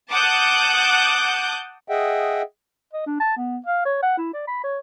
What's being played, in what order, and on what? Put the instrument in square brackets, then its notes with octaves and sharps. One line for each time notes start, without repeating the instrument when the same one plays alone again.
[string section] F#5 A5 D6 D#6 F#6 G6
[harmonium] G#4 D#5 E5 F#5 G5
[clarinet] D#5
D4
A5
B3
F5
C#5
F#5
E4
D5
B5
C#5